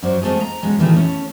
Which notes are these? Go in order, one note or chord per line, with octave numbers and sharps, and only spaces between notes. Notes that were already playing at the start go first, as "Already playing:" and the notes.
F#2 F#3 F#4 C5 D5
G#3 A3 C4 F4 G#4
A#5
F#2 B2 G#3 A3 C#4 F#4
A#2 D#3 E3 A3 G4 G#4
A3 C#4